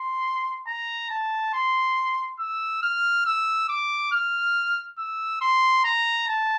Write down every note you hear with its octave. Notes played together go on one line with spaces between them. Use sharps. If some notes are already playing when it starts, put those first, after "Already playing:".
Already playing: C6
A#5
A5
C6
E6
F6
E6
D6
F6
E6
C6
A#5
A5